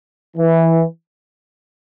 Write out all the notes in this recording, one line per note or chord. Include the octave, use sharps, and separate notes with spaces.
E3